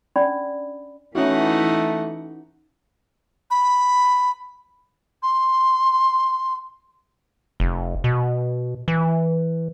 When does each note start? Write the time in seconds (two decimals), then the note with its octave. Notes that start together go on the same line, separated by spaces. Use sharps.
0.16 C#4 D4 D5 B5
1.15 E3 A3 C#4 D#4 E4 F#4 F#5
3.51 B5
5.23 C6
7.60 F1
8.04 B2
8.88 E3